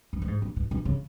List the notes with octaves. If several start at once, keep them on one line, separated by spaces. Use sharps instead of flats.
E2
A#2
G#2
A#2
B2
B2
C#3